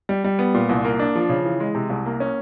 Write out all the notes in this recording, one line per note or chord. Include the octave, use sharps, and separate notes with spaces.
G3
G3
B3
A#2
C2
A#3
D4
F3
C#3
E3
G#3
C3
C2
A#3
C#4